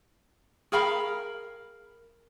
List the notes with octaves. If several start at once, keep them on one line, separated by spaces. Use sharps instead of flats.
G#4 A#4 F5 B5